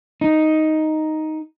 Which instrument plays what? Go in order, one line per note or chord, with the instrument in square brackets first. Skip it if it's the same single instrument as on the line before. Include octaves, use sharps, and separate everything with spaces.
[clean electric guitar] D#4